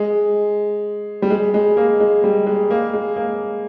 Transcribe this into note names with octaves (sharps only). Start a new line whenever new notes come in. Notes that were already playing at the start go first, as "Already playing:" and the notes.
Already playing: G#3
G3
G#3
G#3
A#3
G#3
G3
G#3
A#3
G#3
A#3